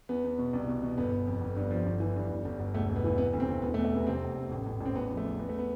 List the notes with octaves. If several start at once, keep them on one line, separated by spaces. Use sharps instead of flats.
E2 B3
E2
B2
C2
B2
B2
G1 B3
G1
F2
G1
G2
F3
G1
E3
G2
G1
G1
G1
E1 A3
E1
B3
E3
C3 B3
D2
C3 C4
D2
E1 B3
A3
E2
A3
C3 B3
F2 C3 C4
F1
F1
A1
A1
A1 C4
E2 B3
F3
A3
E2
E2 B3
A3
B3